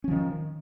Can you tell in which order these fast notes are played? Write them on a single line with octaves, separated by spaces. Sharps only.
C#4 F3 D#3